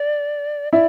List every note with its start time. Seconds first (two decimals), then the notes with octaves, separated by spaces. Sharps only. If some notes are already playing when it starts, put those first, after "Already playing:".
Already playing: D5
0.73 E4 D5